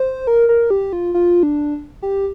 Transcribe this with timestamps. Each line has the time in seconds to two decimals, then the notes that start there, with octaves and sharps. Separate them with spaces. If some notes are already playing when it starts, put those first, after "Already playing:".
Already playing: C5
0.27 A#4
0.49 A#4
0.70 G4
0.93 F4
1.14 F4
1.43 D4
2.02 G4